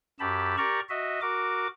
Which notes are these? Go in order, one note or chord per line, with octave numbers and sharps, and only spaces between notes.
F#2 G4 A5 B5
G4 A#4 D5 A#5 C#6
F#4 D#5 E5
F#4 A#4 D6